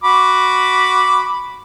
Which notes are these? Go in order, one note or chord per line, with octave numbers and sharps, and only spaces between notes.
F#4 B5 D6